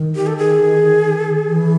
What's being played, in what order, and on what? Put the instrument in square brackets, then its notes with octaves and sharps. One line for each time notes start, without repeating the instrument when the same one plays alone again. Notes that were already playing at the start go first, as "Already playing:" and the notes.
Already playing: [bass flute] D#3
[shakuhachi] G4
A4
G#4
[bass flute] E3